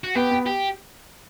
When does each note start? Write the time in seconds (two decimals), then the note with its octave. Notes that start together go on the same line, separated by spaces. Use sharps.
0.04 F#4
0.15 B3 G4
0.31 B3
0.46 G4